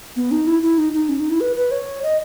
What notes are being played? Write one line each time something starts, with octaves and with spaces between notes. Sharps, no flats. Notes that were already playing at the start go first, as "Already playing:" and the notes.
B3
D#4
E4
E4
D#4
D#4
C#4
D#4
E4
B4
B4
C#5
D#5